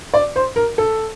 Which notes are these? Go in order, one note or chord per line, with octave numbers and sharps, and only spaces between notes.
D5
C5
A#4
A4